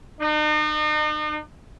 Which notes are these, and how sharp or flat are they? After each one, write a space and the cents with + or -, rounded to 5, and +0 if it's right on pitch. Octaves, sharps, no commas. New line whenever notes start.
D#4 -40